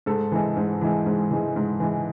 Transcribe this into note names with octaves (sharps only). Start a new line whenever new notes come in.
G#2 A4
E3 G#3
G#2
E3 G#3
G#2
E3 G#3
G#2
E3 G#3